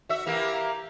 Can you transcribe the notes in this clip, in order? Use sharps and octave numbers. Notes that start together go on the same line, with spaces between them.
F#4 E5
E3 A#3 G4